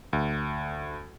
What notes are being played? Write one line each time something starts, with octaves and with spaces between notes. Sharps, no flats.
D2